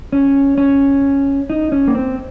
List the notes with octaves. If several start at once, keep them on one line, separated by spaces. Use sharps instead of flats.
C#4
C#4
D#4
C#4
A#3
C4